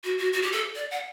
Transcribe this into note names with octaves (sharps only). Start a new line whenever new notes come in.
F#4
F#4
F#4
G4
A4
D5
F#5